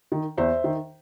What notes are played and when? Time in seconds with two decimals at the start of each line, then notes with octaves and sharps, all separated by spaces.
0.12 D#3
0.37 E2 C5 E5
0.64 D#3